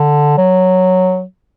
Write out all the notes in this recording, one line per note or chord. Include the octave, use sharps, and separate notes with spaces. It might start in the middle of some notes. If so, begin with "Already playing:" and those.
Already playing: D3
F#3